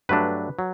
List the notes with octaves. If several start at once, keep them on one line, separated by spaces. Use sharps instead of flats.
G2 F#3 A3 D4 B4
F#3